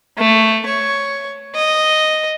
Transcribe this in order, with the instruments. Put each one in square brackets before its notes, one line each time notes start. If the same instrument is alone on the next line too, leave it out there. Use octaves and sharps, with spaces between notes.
[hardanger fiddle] A3
C#5
D#5